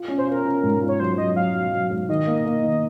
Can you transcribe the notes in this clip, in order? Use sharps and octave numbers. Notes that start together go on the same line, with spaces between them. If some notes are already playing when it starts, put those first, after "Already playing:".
Already playing: F4
C#4
C5
F4 A#4
C#4
G#2
F4
C#5
F#3 C5
F#3 D#5
F#3 F5
F#3
F#3
G#2
D#3 D#5
A#3
A#3
D#3